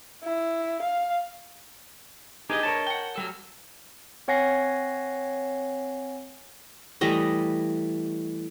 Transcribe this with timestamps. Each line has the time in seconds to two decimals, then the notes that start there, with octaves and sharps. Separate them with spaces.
0.23 E4
0.83 F5
2.50 D4 D#4 G4 G#4 B4 D#5
2.63 A#4 C#5 A5
2.87 F#5 G5
3.16 F#3 G3 A4
4.28 C4 C#5 F#5 G#5 A#6 C7
7.01 E3 G3 A3 D#5